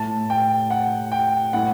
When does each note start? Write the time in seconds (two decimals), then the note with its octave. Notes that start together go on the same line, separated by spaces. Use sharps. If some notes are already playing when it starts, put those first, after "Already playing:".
Already playing: A2 A5
0.30 G5
0.70 F#5
1.12 G5
1.53 A2 F#5